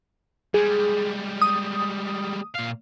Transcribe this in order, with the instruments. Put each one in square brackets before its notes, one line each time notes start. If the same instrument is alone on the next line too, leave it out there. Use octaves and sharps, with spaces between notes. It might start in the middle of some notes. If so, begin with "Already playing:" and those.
[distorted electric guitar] G3 G#3 [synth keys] G#4
[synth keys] D#6
[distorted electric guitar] A#2 F5